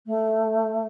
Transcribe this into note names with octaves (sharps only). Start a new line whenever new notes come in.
A3